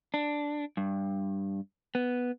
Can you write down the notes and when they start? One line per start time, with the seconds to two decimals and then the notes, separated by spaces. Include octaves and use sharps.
0.14 D4
0.77 G2
1.95 B3